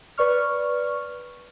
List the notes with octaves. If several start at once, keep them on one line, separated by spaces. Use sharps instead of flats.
B4 D5 C#6 F6